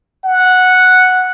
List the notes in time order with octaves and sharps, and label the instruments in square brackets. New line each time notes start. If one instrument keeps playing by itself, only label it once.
[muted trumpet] F#5